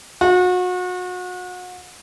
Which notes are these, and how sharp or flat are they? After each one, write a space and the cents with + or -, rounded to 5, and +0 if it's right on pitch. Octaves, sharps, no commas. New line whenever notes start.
F#4 -35